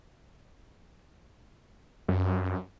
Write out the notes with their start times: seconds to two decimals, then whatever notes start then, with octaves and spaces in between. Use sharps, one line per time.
2.08 F#2